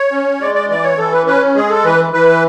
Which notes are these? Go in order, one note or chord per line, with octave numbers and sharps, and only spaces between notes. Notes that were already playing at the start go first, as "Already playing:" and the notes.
Already playing: C#5
C#4
G#3 D5
D5
E3 D5
C#5
E3 A4
B4
C#4 B4
G#3 G#4
A4
E3 B4
E3 B4